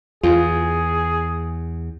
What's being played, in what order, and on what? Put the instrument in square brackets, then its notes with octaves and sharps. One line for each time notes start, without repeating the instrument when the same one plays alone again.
[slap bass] E2 [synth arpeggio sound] F4 [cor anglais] G#4